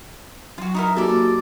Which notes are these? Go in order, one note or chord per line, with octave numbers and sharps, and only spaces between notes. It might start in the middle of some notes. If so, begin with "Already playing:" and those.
F#3 F4 F#4
D#4 E4 A#4
A#3 F#4 G4 A4 D5